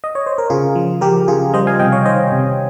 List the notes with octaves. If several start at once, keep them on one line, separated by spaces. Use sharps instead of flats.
D#5
C#5
C5
A#4
C#3 F4 G#4
F3
F3 G4 A#4
C#3 F4 G#4
G3 C5 D#5
F5 G#5
C3 D#5 G5
C#5 F5
D#3 C5 D#5
C3